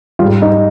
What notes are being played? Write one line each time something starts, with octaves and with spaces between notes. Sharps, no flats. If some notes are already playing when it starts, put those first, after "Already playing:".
G#2 G3 F4 F5
D#4 D#5